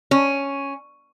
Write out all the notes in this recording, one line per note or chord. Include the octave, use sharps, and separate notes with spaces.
C#4